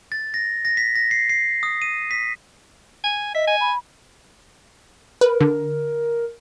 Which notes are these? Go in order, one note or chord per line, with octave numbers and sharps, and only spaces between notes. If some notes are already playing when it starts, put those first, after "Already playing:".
A6
A#6
A#6
B6
A#6
C7
C7
D#6
D#7
B6
G#5
D#5 E5
G#5
B5
A#4 B4
D3